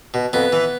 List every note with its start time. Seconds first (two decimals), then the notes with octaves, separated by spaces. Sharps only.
0.14 B2
0.33 F2 B3
0.53 E3